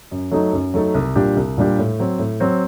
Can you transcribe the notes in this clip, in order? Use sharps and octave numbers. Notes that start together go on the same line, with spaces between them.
F#2
F#3 A3 D#4 A4
F#2
F#3 A3 D#4 A4
C2
A#2 G3 D4 G4
C2
A#2 G3 D4 G4
A2
F#3 C4
A2
F#3 C4